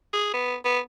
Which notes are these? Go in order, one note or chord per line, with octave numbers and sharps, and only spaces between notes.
G#4
B3
B3